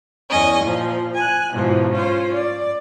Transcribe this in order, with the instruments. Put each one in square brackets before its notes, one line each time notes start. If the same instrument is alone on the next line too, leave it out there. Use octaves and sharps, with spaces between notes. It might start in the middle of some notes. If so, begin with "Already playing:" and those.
[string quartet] E2 C#4 D#5 G#5
A#2 F3
G#5 F#6
G#2 B2 E3 F3
C#4 F4 C5
D5